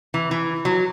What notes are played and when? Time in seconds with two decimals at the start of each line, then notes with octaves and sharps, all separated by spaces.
0.14 E3
0.31 E3
0.65 F#3